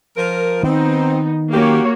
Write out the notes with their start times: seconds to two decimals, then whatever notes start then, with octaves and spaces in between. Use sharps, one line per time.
0.17 F3 A#4
0.63 D#3 B3 C4 D#4
1.53 F#3 A#3 C#4 F#4 G4 C#5